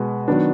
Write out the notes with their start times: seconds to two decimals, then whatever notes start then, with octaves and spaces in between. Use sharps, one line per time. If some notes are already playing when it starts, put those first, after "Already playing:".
Already playing: B2 G#3 B3
0.28 D#3 F#3 B3 D4